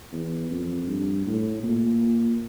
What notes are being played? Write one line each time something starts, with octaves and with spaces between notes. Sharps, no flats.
E2
F2
G2
A2
A#2